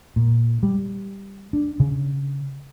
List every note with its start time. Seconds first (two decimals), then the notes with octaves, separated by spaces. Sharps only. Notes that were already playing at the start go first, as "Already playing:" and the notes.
0.16 A#2
0.63 G3
1.53 D4
1.80 C#3